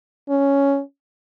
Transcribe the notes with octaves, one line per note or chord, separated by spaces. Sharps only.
C#4